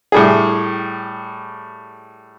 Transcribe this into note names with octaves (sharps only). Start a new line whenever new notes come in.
A2 G3 G#4